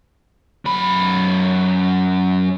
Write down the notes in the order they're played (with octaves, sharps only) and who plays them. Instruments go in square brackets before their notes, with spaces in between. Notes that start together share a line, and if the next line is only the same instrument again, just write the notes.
[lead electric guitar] F#2 B5